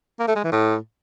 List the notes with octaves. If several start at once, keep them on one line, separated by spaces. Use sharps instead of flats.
A#3
A3
G#3
E3
A2